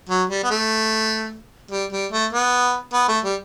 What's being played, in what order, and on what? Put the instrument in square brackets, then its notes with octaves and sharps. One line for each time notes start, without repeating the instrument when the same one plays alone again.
[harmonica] F#3
G3
B3
A3
G3
G3
A3
B3
B3
A3
G3